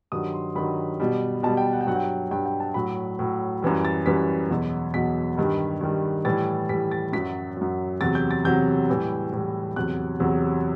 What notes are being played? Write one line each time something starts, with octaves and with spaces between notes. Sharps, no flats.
G2 D#3 F#3 D#6
C6
G2 D#3 F#3 B5
B2 G3
B2 G3 A5
G5
F#5
G5
G2 F#3 F#5
G5
F#5
G2 F#3 G5
G5
A5
A2 F#3 B5
A2 F#3
F#2 E3 G3
A6
F#2 E3 G3 B6
E2 B2 F#3
E2 B2 F#3 B6
G2 D#3 G3
G2 D#3 G3
A2 E3 G3 A6
A2 E3 G3 B6
A6
F#2 F#3 B6
F#2 F#3
E2 C3 F#3 A6
G6
A6
E2 C3 F#3 G6
A2 E3 G3
A2 E3 G3
E2 C3 F#3 F#6
E2 C3 F#3